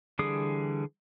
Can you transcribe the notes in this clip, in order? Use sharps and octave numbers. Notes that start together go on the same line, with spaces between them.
D3 E3 G3 G#4 D#6